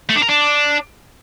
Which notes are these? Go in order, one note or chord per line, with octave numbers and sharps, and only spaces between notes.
A3
D4
A#4
D4